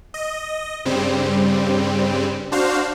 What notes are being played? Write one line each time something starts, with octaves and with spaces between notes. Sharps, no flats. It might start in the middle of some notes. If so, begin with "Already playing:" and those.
D#5
G2 C#3 G3 C4
D4 F#4 C5 F5